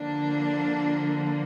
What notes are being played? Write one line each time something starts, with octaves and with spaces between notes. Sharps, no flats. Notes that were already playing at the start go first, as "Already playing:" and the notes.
Already playing: D3 F3 A#3 D4